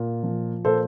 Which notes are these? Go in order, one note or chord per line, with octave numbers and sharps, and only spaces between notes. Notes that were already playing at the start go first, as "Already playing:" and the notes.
Already playing: A#2
F3
A#2 A4 C5